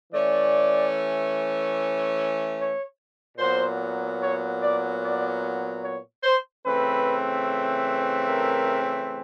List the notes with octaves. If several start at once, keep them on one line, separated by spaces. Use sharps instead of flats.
E3 A3 C#4 D5
C#5
A#2 F#3 B3 C5
C#5
D5
D5
C#5
C5
C#3 E3 A3 C4 B4
A#4